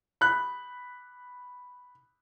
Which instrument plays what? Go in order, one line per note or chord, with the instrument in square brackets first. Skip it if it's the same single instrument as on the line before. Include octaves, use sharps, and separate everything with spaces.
[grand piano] B5 F#6